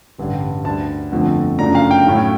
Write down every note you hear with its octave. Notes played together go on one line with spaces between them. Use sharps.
A1 G2 D3 G3
D2 D3 G3 A5
G1 F2 D3 F3 A3
F#2 C#3 F3 A3 D4 A#5
F5
G5
A2 F#3 A3 C#4 E4